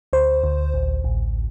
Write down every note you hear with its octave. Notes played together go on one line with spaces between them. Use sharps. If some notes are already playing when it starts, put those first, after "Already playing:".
D2 C5
D2
A1
A1